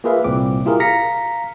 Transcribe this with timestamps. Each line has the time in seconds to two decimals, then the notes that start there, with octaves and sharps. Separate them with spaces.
0.04 A#3 F4 G#4 B4 E5 F5
0.24 C2 A#2 C4 D6
0.66 E4 F4 G4 G#4 A#4
0.80 F5 A#5 A#6 B6 C#7